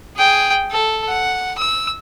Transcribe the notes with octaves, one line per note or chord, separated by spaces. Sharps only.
G#4 G5
A4
F#5
E6